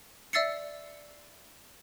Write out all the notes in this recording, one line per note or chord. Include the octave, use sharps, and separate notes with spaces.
D5 E5 E6 A6 C7 C#7